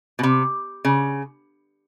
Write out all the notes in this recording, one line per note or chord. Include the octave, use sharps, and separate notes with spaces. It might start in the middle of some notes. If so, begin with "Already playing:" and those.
B2
C3
C#3